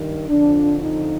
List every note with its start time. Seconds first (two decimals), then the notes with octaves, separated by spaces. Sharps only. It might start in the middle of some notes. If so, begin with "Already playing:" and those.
Already playing: G2 D#3
0.28 F2 D3 F3 D4
0.82 D#4